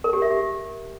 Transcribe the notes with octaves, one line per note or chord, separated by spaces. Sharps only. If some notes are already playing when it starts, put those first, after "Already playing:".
A#4
G4
E5
G4